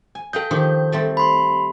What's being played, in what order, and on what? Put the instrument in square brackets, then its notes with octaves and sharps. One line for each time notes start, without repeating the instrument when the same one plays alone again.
[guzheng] G#5
[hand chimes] A4 G6 [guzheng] D#5 F5 G5
[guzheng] D#3 F3 G4
G3 A3 C4
[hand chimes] B5 C6